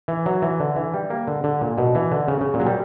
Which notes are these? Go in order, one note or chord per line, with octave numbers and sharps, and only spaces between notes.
E3
F#3
E3
D3
E3
G3
A#3
D3
D3
A#2
B2
E3
D3
C#3
C#3
A#2
F#3
G3